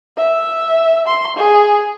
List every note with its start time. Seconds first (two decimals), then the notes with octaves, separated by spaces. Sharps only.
0.17 E5
1.07 C6
1.37 G#4